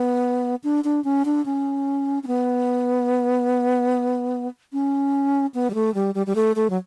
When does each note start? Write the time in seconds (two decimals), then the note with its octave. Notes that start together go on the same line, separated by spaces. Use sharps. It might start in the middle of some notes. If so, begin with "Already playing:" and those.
Already playing: B3
0.64 D4
0.84 D4
1.04 C#4
1.25 D4
1.46 C#4
2.23 C#4
2.27 B3
4.73 C#4
5.54 B3
5.70 G3
5.74 A3
5.94 G3
6.15 G3
6.27 G3
6.35 A3
6.56 A3
6.70 F#3